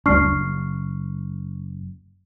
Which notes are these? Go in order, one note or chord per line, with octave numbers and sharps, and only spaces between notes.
F#1 D2 G3 D4 C#6 F6 C7